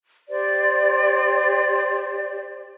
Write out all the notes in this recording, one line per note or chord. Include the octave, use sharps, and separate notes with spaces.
G4 C5 D5